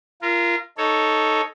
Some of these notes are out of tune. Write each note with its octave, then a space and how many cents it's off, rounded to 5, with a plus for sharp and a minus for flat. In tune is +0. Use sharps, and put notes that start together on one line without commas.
F4 -25 A#4 +0
D#4 +0 A4 +0 C#5 +0